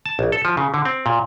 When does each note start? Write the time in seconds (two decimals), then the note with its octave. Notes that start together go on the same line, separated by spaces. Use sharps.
0.06 A5
0.19 A#1
0.32 A4
0.45 F3
0.57 C#3
0.74 D3
0.85 C4
1.06 A#2